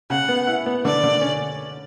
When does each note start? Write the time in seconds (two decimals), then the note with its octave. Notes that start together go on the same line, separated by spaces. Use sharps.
0.10 C#3 F#5
0.28 B3
0.47 E4
0.66 B3
0.85 D3 D5
1.04 D3
1.21 C#4